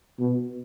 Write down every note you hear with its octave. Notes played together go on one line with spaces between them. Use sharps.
B2